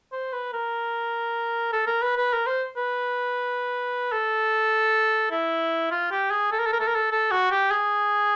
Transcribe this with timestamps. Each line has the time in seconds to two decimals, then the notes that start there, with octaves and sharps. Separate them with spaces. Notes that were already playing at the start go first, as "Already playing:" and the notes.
0.12 C5
0.32 B4
0.53 A#4
1.73 A4
1.87 A#4
2.02 B4
2.17 B4
2.33 A#4
2.47 C5
2.77 B4
4.12 A4
5.31 E4
5.91 F4
6.11 G4
6.31 G#4
6.51 A4
6.59 A#4
6.66 A4
6.73 A#4
6.80 A4
6.87 A#4
6.95 A4
7.12 A4
7.31 F#4
7.51 G4
7.71 G#4